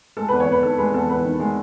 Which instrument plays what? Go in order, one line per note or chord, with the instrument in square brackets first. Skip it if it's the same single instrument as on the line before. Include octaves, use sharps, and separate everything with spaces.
[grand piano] G#3 A4
E2 B4
C#5
E2 B4
D#3 A4
G#3 B4
E2 A4
E2 B4
D#3
G#3